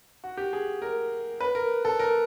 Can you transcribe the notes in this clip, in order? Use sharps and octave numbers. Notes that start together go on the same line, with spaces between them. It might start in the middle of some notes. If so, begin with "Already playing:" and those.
F#4
G4
G#4
A#4
B4
A#4
A4
A#4